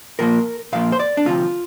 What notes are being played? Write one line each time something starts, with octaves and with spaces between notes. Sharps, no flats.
A#2 F3 A#3 A#4
A#2 F3 A#3 F5
C5
D5
D4
D2 C3 F3 F4